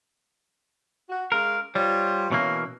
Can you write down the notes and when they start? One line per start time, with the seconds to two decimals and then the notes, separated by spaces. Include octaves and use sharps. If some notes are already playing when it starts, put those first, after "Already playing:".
1.09 F#4
1.32 G#3 C#4 A#4 F5
1.75 G3 F4 C5 C#5
2.31 B2 E3 A#3 C#4